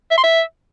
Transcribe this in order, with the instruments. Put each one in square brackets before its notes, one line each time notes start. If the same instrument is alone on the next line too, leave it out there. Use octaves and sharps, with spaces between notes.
[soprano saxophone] E5
C6
E5